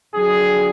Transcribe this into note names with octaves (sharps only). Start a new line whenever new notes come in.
F2 D3 F#3 G#4